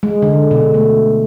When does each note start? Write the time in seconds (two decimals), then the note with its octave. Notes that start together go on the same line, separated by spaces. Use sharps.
0.03 G#3
0.22 D3
0.51 B2
0.74 A3